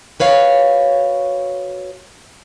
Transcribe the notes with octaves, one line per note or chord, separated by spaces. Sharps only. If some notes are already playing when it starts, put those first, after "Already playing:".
F#4 B4 C#5 F5